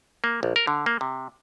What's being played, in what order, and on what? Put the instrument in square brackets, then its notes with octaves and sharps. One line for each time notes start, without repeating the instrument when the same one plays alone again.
[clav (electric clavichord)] A#3
A#1
A#4
D3
A#3
C3